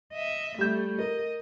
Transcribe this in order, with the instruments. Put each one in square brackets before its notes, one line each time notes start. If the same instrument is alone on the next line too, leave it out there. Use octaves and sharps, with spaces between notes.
[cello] D#5 E5
[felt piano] G3 G6 [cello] A3
[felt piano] A#4 [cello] D#5